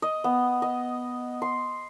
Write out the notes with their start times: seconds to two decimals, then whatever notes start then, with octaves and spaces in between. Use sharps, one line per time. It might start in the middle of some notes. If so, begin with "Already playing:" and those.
0.02 D#5
0.24 B3
0.62 D#5
1.42 C6